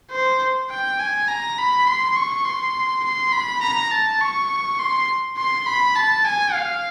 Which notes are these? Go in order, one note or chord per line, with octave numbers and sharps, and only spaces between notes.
C5
G5
G#5
A#5
B5
C6
C#6
C6
C6
B5
A#5
A5
C#6
C6
C6
B5
A5
G#5
F5